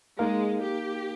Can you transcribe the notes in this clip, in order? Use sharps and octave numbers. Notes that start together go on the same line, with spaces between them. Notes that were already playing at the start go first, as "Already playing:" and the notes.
G#3 A#3 D#4 A#4 F5
G4